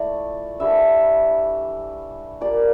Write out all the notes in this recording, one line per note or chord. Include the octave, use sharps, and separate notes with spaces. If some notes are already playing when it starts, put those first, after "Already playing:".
Already playing: A#2 A3 E4 D5
E3 G3 D4 E5
A#2 G3 A#3 D5